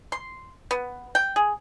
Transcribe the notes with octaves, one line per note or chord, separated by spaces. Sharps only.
C6
B3
G5
G#4